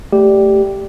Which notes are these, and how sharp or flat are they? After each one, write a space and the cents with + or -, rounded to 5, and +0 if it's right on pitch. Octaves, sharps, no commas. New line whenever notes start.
A3 +0 G4 +0 D5 +0